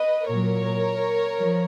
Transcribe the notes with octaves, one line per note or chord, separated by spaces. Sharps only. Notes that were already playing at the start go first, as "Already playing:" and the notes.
Already playing: B4 D#5
A#2 F#3 A#4 C#5
F3